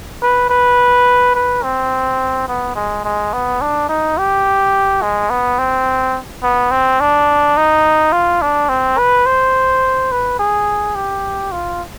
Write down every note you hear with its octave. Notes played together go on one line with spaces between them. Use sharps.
B4
B4
B4
C4
B3
G#3
G#3
B3
D4
D#4
G4
G#3
B3
C4
B3
C4
D4
D#4
F4
D4
C4
B4
C5
B4
G#4
G4
F4